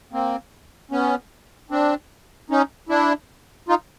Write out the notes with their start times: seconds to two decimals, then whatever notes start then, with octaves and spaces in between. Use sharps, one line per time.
0.12 A#3 C4
0.91 B3 C#4
1.70 C4 D4
2.50 C#4 D#4
2.89 D4 E4
3.69 D#4 F4